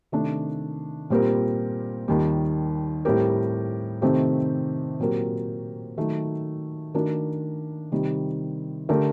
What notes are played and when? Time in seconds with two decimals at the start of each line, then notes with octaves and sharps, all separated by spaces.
0.12 C3 D#3 A3 D4
1.10 A#2 G3 C4 G4 A#4
2.08 D#2 D#3 G3
3.05 A2 G3 C4 G4 A#4
4.02 C3 D#3 A3 C4 G4
5.00 A#2 F#3 C4 G4 A#4
5.97 D#3 F#3 A3
6.94 D#3 A3 D4 F#4 A#4
7.92 C3 D#3 G3
8.89 D3 A3 D4 G4 A#4